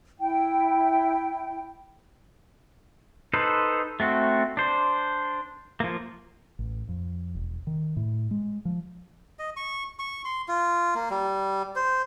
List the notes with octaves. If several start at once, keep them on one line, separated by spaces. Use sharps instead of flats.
E4 G5
D#4 A4 B4 C5
A3 C4 F#4
D4 C5
F3 A#3
A1
F2
E1
D#3
A2
G#3
F3
D#5
C#6
C#6
C6
F4
A#3
G3
C5